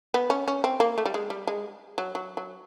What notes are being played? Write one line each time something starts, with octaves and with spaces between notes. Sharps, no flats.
B3
C#4
C#4
C4
A#3
A3
G3
G#3
G3
G#3
F#3
F#3
F#3